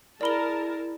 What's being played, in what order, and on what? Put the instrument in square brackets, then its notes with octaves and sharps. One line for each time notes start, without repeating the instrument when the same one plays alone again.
[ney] E4 [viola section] G#4 A#4 A5 [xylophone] D5 B5 G7